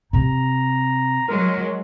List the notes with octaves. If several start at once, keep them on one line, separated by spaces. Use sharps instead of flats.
C3 C4 A#5
F#3 G#3 A#4